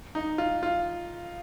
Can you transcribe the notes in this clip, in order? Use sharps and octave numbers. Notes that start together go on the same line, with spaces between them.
D#4
F4
F4